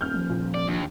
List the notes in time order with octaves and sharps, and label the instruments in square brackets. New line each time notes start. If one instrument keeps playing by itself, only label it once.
[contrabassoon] D#1 [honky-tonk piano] F6 G6
[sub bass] F3
[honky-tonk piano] A#2
[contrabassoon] D#1 [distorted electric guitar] D5
[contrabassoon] A#1 [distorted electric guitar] D#2